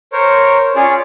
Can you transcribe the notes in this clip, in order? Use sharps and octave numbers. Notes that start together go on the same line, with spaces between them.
A#4 C5 C#5
C#4 F4 G#4 C#5 D5